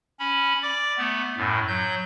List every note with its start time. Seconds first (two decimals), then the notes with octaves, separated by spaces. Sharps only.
0.19 C#4 B5
0.63 D5 D6
0.97 A3 B3
1.37 F#2 A2
1.68 F#3 G6